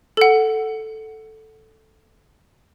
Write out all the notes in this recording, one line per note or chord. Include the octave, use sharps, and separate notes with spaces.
A4 F#5